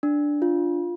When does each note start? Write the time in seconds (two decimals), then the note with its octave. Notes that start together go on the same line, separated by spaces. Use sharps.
0.03 D4
0.42 F4